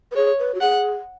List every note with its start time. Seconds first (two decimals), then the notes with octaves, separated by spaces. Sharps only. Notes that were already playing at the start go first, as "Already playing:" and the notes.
0.11 B4
0.16 G#4 C#5
0.39 B4
0.55 F#4
0.61 G#4 F#5